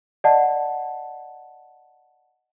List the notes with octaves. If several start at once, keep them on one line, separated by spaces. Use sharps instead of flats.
D5 D#5 F#5 A5